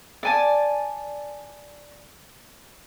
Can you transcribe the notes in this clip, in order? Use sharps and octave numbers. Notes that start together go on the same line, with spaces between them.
D5 G#5 A5